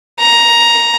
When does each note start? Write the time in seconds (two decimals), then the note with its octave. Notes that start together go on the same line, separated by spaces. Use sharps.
0.20 A#5